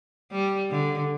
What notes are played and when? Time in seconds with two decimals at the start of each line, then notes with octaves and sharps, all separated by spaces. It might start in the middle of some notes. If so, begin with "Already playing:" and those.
0.31 G3
0.71 D3